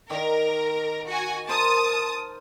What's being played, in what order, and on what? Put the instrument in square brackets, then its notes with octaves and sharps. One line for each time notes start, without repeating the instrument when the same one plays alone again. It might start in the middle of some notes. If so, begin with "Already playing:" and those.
[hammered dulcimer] D#3 A#5 D6 [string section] A#4
[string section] F#4 G#5
[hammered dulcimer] A#4 C5 [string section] A5 D#6